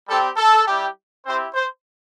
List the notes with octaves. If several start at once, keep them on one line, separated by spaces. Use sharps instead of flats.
G3 C4 G4 A4
A4
G3 E4 G4
C4 E4 G4 C5
C5